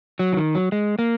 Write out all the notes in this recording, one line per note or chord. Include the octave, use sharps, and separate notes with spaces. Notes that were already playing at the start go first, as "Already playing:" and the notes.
F#3
E3
D#3
F#3
G#3
A#3